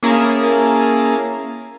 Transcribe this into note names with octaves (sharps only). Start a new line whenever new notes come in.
A#3 C#4 E4 G#4 A#4 A5